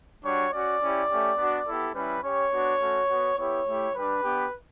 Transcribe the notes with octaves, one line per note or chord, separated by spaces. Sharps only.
G3 D4 F#4 C#5
C#4 F#4 D5
C#4 E4 G4
A3 C#4 G4
B3 D4 F#4
B3 E4 G4 A4
G3 C#4 E4 B4
C#4 G4 C#5
B3 D4 F#4
A3 C#4 F#4
B3 F#4
B3 E4 G4 C#5
A3 E4 G4
G3 D4 G4 B4
B3 D4 G4